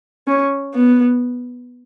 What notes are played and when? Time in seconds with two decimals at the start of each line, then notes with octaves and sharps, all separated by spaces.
0.28 C#4
0.75 B3